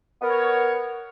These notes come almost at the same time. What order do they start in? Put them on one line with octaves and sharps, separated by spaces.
B3 A#4 C#5